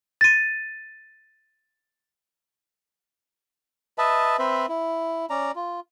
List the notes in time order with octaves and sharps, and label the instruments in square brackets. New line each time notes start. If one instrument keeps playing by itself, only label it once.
[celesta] A6 D#7
[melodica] B4 D#5 E5 A5
C4 B4 C5 E5
E4
C#4 D5 A#5
F4